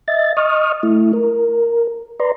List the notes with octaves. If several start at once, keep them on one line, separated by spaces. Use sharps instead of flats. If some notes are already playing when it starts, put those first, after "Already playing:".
D#5 E5 A6
D#5 C#6 D#6 F6
A3 E4
A#4
B4 D5 A#5 C6